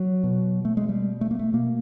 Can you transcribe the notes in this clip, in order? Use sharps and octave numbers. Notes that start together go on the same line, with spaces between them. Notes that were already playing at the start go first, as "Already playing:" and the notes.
Already playing: F#3
B2
A3
G#3
G3
A3
A#3
A3
B2 A#3